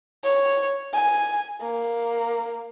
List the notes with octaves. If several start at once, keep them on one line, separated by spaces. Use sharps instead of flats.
C#5
G#5
A#3